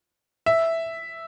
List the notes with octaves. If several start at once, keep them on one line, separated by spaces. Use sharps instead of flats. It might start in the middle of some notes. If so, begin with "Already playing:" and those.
E5